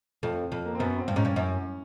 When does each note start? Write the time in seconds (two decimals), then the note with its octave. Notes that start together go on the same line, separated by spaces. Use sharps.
0.23 F2 A3
0.52 F2
0.66 A#3
0.75 C4
0.79 F#2 B3
0.98 C4
1.08 G2
1.16 G#2 C#4
1.25 G2
1.36 F#2